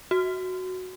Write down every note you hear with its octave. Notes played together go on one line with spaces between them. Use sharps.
F#4